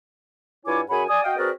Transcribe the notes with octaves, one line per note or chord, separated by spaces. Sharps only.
G2 E4 F4 C#5 G#5 D6
F#2 G#4 C#5 F#5 G#5 B5
D5 G#5 D#6
F#4 D#5 F5 G5
C4 F#4 G#4 A#4 B4 D5